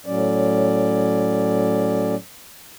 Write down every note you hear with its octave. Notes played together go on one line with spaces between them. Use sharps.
A2 F#3 C#4 D5